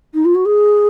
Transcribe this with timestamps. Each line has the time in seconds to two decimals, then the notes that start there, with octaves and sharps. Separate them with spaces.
0.14 D#4
0.25 F4
0.34 F#4
0.45 G#4